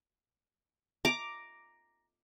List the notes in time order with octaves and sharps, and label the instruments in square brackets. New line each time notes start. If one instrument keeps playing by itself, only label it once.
[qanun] A#5 D6